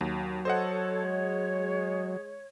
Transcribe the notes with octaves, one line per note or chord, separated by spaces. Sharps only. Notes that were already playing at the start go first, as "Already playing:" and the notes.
D#2 F#3
A4 C5 C#5 D#5 F#5
G#3